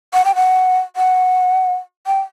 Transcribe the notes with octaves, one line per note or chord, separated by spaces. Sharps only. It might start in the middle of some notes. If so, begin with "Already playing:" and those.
F#5
G5
F#5
F#5
G5